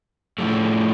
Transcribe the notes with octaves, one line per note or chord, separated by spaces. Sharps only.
A2 F3 A3